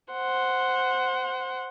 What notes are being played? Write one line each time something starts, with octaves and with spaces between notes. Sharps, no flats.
C5 F#5